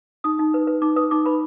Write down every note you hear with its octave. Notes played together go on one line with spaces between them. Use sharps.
D#4 D#6
D#4
B4
B4
D#4 D6
B4 D#6
D#4 D6
B4 B5